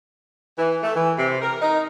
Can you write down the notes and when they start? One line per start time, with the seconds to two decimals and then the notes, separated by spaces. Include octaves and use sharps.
0.59 E3
0.83 A3
0.95 E3
1.19 C3
1.42 A#4
1.62 D#4